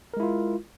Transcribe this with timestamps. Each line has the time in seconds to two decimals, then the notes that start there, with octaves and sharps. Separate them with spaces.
0.14 A#4
0.17 G#3
0.20 E4
0.23 F4